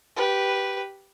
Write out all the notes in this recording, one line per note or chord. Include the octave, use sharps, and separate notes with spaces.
G4 B4